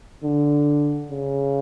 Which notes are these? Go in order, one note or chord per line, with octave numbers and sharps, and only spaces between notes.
D3
C#3